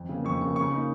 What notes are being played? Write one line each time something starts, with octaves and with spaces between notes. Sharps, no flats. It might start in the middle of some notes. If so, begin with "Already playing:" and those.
Already playing: F2
C#3 A#3
F2 C#6
C#3 A#3 C#6
C#3 C#6
A#3 D#4